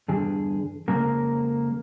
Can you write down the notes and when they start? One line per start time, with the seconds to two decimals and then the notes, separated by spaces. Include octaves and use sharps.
0.08 E2 G2 D3 G#4
0.88 F2 C#3 G#3 A#3 A#4